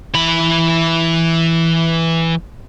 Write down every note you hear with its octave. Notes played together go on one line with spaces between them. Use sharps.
E3 B5